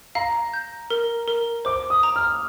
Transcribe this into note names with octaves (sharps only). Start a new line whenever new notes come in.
F5 A#5
G6
A#4
A#4
C5 D6
D#6
A#5
F6